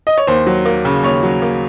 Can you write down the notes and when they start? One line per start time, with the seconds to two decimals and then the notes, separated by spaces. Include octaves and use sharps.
0.07 D#5
0.18 C#5
0.27 D#2 C5
0.46 F#3
0.66 A#3
0.85 C#3
1.03 D#2 C#5
1.23 F#3
1.42 A#3